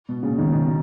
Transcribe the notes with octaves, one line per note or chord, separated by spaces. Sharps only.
B2
A#2 C#3
B2 D#3
B2